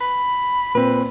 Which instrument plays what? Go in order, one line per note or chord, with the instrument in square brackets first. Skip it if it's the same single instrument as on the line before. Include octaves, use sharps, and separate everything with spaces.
[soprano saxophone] B5
[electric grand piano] A#2 C4 [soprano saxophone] B4